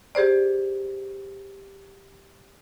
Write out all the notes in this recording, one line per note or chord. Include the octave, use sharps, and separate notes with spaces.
G4 G#4 C5 D5